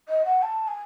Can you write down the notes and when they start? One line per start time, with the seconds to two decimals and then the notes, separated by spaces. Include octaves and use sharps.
0.09 D#5
0.25 F#5
0.42 A5
0.68 G#5